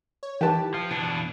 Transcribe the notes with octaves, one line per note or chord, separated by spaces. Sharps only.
C#5
E3 G4 B4 A5
F3
B2 E3 D4